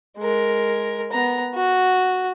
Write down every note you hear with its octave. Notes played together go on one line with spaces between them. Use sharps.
G#3 A#4
B3 A#5
F#4